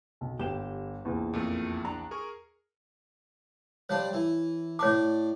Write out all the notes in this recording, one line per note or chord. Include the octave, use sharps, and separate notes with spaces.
B1
G1 G4 E7
A#1 E2
F2 A#2 A3 A#4
D4 A#5
G#4 A#4 C#6
F3 G3 D4 C#5
E3
A2 D4 C#5 D6